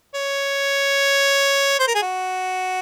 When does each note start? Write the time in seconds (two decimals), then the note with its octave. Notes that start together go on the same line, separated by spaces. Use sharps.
0.15 C#5
1.79 C5
1.88 A#4
1.95 G#4
2.02 F#4